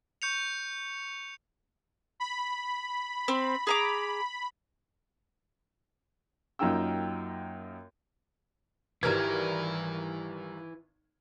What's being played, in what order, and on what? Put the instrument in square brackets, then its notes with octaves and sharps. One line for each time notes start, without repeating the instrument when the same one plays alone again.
[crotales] C#6 G6 C#7 F7
[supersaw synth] B5
[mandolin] C4
G#4 A#5 D6
[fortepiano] F#2 A#3 D#4 F4 G5 E6
[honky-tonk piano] G#1 A#4 G#6 [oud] E3 G3 [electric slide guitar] E4 B4